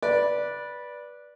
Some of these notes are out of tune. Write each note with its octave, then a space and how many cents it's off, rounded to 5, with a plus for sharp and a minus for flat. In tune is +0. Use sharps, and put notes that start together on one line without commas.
B4 -15 D5 +0